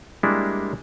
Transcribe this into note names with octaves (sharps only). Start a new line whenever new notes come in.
G3 G#3 A#3 D4 E4